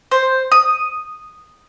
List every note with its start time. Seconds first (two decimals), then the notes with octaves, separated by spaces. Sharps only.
0.11 C5
0.52 D#6